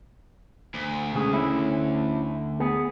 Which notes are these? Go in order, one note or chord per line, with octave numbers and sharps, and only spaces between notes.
D2
C#2 C#3 G#4
C#4 E4
B3 G#4